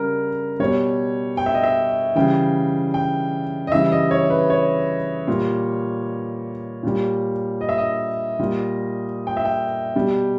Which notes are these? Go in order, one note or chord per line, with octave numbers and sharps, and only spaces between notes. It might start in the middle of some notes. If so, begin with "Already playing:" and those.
Already playing: C#3 G3 A#4
B2 G3 C#5
G5
E5
D#5
E5
C#3 E3 G3 G5
G5
D#5
C#3 E3 G3 E5
D#5
C#5
B4
C#5
A#2 G3
A#2 G3
D#5
E5
D#5
A#2 G3
G5
E5
G5
B2 G3